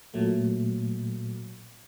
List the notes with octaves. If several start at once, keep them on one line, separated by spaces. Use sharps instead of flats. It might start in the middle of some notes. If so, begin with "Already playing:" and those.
A#2 F#3 A3